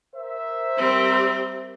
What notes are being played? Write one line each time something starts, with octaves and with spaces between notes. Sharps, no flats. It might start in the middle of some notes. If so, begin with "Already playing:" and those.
A#4 C5 E5
G3 C4